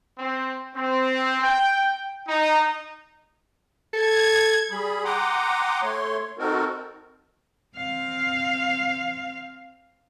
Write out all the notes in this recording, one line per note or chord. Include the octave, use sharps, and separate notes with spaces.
C4
C4
G5
D#4
A4 G#6
G3 G#4 B5
F#5 G5 A#5 C6 D6 D#6
A3 C#5 C6
C4 D#4 F#4 A4 A#4
C4 F5